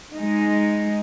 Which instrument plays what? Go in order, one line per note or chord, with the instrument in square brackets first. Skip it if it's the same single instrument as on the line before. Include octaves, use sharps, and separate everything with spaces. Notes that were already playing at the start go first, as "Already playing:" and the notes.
[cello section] G#3 D#4